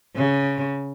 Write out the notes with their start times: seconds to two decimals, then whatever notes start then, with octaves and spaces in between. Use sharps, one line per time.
0.16 C#3